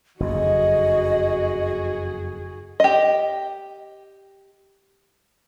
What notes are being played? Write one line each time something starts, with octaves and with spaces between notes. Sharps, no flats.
F#1 F2 F#4 G#4 D#5
G4 D#5